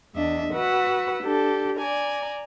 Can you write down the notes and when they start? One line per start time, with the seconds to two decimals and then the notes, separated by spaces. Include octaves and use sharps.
0.16 E2 D4 D#5 E5
0.53 F#4 B4 F#5 E6
1.23 D4 G4 A4
1.77 D5 G#5 A#5